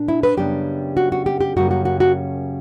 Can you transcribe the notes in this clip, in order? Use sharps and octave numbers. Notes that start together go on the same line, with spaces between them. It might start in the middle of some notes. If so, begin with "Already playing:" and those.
Already playing: A#2 D4
E4
B4
F#2 C#3 G3 B3 D4 G4
F#4
F#4
G4
G4
F#2 C#3 G3 A#3 F#4
F#4
F#4
F#4